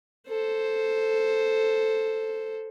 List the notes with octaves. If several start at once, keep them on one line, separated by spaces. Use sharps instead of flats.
A4 C5